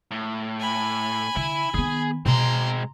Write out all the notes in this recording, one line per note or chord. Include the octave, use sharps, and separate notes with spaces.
A2
G#5 B5
D3 E4
D#3 B3 G#4
B2 G#3 C4 A#5 C6